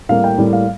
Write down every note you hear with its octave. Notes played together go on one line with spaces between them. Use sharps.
A2 G3 A#3 F5
G5
A2 G3 A#3
F5